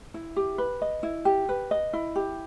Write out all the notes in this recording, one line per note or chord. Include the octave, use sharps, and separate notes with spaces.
E4
G4
B4
D#5
E4
G4
B4
D#5
E4
G4